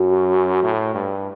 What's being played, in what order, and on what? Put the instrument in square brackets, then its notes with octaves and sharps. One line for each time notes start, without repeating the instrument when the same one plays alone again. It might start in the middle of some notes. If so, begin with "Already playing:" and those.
Already playing: [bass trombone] F#2 [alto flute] F#4
[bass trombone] A2
G2